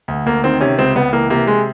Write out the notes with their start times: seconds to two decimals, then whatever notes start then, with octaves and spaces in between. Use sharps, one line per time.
0.08 D2
0.26 D2 A#3
0.44 D#3 C4
0.61 C3 C#4
0.79 C#2 C4
0.96 C#2 B3
1.13 E3 A#3
1.30 C3 A#3
1.47 G#3